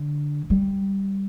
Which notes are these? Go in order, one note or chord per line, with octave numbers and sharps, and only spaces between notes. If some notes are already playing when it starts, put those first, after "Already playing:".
Already playing: D3
G3